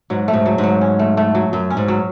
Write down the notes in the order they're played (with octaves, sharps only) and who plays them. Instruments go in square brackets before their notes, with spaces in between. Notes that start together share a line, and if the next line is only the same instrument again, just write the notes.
[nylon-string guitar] G#2 [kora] F#3
[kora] A3
[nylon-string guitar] G#2
[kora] F#3
[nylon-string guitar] G#2
[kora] F#3
C#4
A3
A3
F#3
[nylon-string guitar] F#2 [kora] F#3
[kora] C#4
[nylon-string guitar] G#2
[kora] F#3